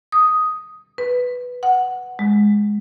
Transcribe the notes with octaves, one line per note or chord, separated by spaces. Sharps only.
D#6
B4
F#5
G#3